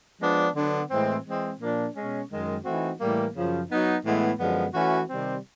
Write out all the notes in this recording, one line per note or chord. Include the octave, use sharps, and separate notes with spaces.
F3 G#3 B3 D4
D3 F#3 B3 D4
A2 E3 G#3 C4
E3 G#3 C4
A#2 F3 A#3 D4
B2 G#3 C#4
F#2 D#3 G#3
E3 A3 C4 D#4 F#4
A2 E3 G3 A#3
F#2 C#3 F3
F#3 B3 D#4
A2 E3 G#3 B3
F#2 D3 F3 G#3 B3
E3 A3 C#4 F#4
C3 D#3 G3 C4